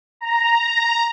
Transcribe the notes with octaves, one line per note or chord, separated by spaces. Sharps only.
A#5